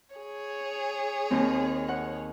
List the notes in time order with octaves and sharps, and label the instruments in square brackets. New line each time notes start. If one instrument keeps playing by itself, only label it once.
[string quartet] G#4 C#5
[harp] D#2 C4
F#5